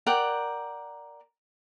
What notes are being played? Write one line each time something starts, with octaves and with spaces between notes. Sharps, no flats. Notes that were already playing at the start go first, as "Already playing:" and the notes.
A#4 D5 F#5 G5